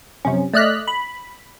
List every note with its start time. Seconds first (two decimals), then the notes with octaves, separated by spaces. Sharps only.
0.25 F#2 C3 F3 C#4
0.53 A3 D5 D#5 F6 F#6 B6
0.88 B5